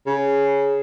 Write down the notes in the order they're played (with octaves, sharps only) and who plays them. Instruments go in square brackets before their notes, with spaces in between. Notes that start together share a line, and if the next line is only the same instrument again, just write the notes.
[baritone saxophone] C#3